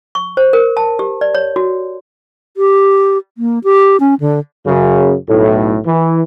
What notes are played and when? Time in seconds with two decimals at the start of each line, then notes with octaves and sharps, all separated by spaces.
0.15 C#6
0.37 C5
0.53 A#4
0.77 A5
0.99 G4
1.21 D5
1.35 C#5
1.56 F#4
2.57 G4
3.38 A#3
3.64 G4
4.00 C#4
4.20 D3
4.66 F#2 C#3
5.28 B1 A2
5.86 E3